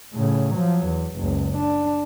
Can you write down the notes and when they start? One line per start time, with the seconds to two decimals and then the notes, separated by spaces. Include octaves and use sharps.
0.14 A2 C#3
0.54 F3 F#3
0.86 E2
1.16 F#1 C#2
1.57 D4